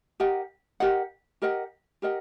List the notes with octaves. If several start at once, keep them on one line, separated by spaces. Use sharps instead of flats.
G4 A#4 D#5 F#5
G4 A#4 D#5 F#5
G4 A#4 D#5 F#5
G4 A#4 D#5 F#5